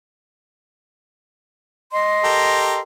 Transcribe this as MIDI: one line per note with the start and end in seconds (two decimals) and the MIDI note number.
1.91 2.79 75
1.91 2.79 84
2.24 2.79 67
2.24 2.79 69
2.24 2.79 70